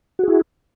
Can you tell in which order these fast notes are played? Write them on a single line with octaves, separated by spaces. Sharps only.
F#4 G#4 E4